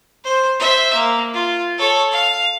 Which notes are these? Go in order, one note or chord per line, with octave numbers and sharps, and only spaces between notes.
C5
C5 E5
A#3
F4
A4 C#5
F5